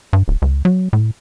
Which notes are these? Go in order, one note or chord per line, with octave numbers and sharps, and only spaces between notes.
G2
D1
C#2
F#3
A2